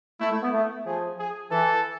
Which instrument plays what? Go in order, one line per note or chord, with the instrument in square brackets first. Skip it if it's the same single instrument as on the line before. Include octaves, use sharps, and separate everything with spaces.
[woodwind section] A3 [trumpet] E4
[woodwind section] A3
B3
A3
[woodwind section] F3 [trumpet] G#4
[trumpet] G#4
[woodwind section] E3 [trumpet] A4